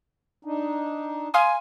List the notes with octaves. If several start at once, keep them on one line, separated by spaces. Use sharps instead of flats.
D4 D#4
F5 G#5 C6 D#6